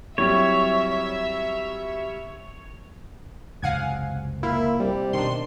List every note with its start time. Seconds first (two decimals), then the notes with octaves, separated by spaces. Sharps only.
0.18 F#3 G3 C4 E4 C#5 E5
3.62 C#2 F#2 C3 F5 F#5 G#5
4.43 A#3 E4 F4
4.80 C3 G3
5.13 B2 D#3 D4 C6